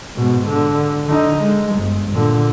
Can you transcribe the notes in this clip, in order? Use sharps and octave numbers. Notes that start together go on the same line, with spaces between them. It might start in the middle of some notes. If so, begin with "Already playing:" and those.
G#2 B2
D3
D3 D#4
G#3
G1
A#2 D3